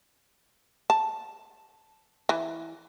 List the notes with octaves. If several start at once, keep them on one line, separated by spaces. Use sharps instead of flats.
A5
E3